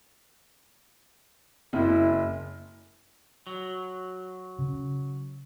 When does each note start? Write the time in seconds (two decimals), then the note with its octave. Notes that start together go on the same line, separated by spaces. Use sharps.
1.73 F#1 E4
3.47 F#3
4.59 C#3